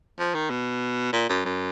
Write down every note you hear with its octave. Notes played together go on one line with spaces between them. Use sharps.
F3
D#3
B2
A#2
F#2
F#2